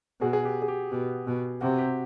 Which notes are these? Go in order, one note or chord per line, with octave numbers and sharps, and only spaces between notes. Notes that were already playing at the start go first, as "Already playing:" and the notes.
B2 F#4 G#4
G#4
G4
G#4
G4
B2 G4
B2
C3 F#4
G4